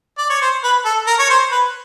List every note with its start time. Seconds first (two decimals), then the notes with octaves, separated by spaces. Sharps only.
0.18 D5
0.30 C#5
0.42 C5
0.64 B4
0.85 A4
1.07 A#4
1.19 C#5
1.30 C5
1.52 B4